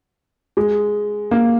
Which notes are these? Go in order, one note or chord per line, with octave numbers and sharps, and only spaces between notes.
G#3
A#3